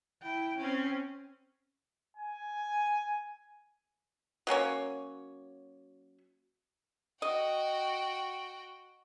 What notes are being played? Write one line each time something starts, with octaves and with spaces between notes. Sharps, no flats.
E4 G5
C4 C#4
G#5
F#3 A#3 C#4 C#5
F#4 D#5 G5